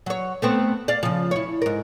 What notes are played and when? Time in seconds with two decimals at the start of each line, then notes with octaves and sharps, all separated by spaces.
0.06 F#3 C#5
0.42 A3 B3 C4
0.88 D5 F5
1.03 C#3 F3
1.31 E4 C#5
1.62 G#2 A#4